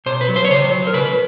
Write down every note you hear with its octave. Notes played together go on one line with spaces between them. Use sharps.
B2 C5
B4
F#3
C5
C#5
C#3 C5
F#3
A#4
C#3 B4